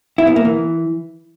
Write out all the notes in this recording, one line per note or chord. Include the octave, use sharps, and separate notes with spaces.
E4
B3
A#3
E3